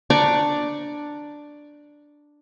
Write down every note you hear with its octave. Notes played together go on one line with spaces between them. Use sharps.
D4 D5 A#5 C#6